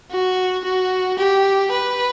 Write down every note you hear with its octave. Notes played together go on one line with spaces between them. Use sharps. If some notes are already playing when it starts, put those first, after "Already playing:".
F#4
F#4
G4
B4